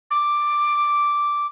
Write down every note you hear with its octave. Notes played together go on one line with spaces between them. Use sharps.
D6